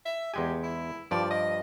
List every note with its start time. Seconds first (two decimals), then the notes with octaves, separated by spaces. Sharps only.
0.06 E5
0.34 E2 G#3 G4 G#5
0.63 E4
1.11 G2 F3 D5
1.30 D#5